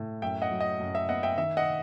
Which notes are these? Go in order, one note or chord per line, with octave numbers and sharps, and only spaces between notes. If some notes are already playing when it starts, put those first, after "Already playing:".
Already playing: A2 E4
F#2 E5 G5
D#5 F#5
F#3
D#5
F#2
E5
B3 D#5 F#5
E5 G5
D#3 E5
D#5 F#5